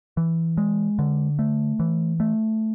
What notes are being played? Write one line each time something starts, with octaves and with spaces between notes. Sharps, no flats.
E3
G#3
D3
A3
E3
A3